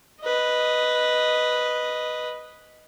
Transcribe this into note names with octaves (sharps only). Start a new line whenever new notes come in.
B4 D#5